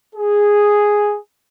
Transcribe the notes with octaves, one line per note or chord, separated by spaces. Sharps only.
G#4